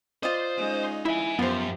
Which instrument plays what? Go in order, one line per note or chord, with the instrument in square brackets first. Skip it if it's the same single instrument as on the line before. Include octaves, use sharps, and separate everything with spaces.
[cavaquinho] F4 D5 D#5 [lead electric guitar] C5
[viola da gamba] G#3 C#4 D#4
[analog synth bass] E4 [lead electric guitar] E5 G#5
[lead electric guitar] F#2 [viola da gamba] F3 G4 [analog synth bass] B3 [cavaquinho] F4 C5